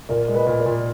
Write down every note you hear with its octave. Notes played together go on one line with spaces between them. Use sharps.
A#2 A#4 D5
G#3
B4 D#5
A#2
A#4 D5
A#2